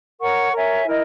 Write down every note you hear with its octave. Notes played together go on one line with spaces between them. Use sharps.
A#4 C#5 F#5 C#6
A#4 C#5 E5 G#5
E4 A#4 D#5